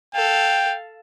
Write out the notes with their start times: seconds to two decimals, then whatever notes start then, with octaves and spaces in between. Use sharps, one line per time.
0.15 A4 F5 G5